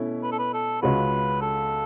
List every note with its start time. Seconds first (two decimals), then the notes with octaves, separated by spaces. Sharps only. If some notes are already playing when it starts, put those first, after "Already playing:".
Already playing: B2 A3 C#4 E4
0.23 B4
0.32 A4
0.39 B4
0.54 A4
0.82 C#2 C#3 G#3 C#4 F#4 B4
1.41 A4